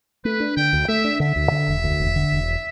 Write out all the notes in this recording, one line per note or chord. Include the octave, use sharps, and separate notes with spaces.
A3 B4
D4
D3 G5
D2
A3 E5
D4
D3 E5
D2
D3
E1
D2
E1
D3
E1